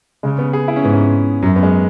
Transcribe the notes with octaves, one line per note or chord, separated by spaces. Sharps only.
C#3 G#3
B3
G#4
E4
C#4
G#2 B3
C#4
F#2 F#3
B3
G#3